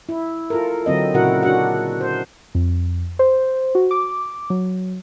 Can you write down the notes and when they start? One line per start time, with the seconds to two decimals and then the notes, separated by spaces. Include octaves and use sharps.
0.09 E4
0.50 F4 A4 A#4
0.86 D3 F#3 C4 D#5
1.14 A#2 C#3 E4 F#4 A#4 F#5
1.43 D4 F#4 F#5
2.01 C5
2.55 F2
3.19 C5
3.75 F#4
3.91 D6
4.50 F#3